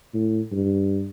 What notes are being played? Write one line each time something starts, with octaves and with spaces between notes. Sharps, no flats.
A2
G2